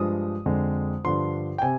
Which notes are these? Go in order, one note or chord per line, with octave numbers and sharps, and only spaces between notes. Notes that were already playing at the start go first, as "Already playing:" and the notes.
Already playing: G2 F3 G#3 D#6
F2 D3 G#3
G2 D3 F3 C6
G5
C3 G#5